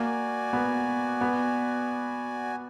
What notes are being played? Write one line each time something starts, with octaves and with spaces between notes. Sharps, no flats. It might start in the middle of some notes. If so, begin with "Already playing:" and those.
Already playing: A#3 F#4 D5 G#5
B3
B3